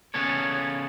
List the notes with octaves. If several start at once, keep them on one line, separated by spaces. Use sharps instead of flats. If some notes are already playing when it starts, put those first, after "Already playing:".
C#3 B3 C#4 A4 C#5